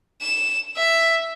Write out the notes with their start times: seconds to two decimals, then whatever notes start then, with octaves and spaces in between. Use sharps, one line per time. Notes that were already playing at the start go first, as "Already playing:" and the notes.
0.22 E7
0.77 E5